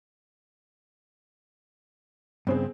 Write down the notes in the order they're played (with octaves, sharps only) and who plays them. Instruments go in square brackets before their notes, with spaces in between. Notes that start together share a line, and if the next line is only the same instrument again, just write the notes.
[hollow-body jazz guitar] G2 C#3 [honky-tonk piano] B3 C4 G#4